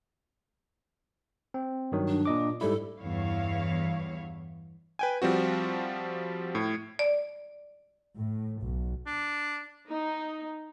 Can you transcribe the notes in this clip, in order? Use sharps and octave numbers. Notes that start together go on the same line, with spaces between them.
C4
G2 D#3 F#3
D4
A#2 D#5 D6
G#2 G3 E4 A4
E2 G2 E4 C#5 F5
B4 G5 G#5
F3 G3 C4 F#4
A2
D5
A2
B1
D4
D#4